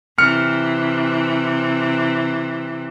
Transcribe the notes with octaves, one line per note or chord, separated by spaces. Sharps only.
C3 E3 F6 C#7